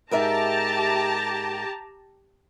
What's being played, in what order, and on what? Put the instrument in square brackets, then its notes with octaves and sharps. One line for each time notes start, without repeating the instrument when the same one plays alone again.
[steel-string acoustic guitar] G#2 A#4 E5 [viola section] G4 A5 A#5